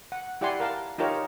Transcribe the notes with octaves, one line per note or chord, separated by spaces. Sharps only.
F#5
E4 G4 D5 F#5 G#5 C6
A#4 F5 A5
D#4 F4 G4 A#4 C#5